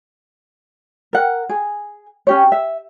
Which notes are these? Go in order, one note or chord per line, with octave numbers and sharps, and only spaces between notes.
A#4 F#5
G#4
C#4 G4 C#5
E5